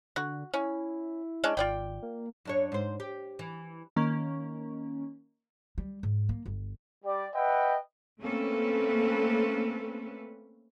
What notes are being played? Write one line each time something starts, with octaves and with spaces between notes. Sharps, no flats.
D3 F#4
C#4 E4
G#3 C#4 D4
G#1 F4 D5 G5
A#3
F#2 D4 C#5
G#2 C5
G4
E3
D#3 A#3 C#4
G3
G#2
A#3
G1
G3 G4 D5
B4 D#5 E5 F#5 G5
A3 A#3 C4 C#4 A4 B4